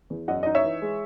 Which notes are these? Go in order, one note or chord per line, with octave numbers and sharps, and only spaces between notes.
E2
F#2 D#5 F#5
D#4 D#5
C#5 E5
E3
G#3